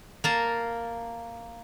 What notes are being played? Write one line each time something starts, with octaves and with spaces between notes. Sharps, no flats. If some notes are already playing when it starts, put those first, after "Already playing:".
A#3 A5 A#5